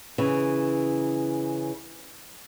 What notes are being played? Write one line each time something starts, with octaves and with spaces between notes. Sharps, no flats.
C#3 E3